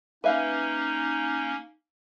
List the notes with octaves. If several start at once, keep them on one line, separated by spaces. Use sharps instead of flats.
A#3 C#4 D#4 B4 E5 F5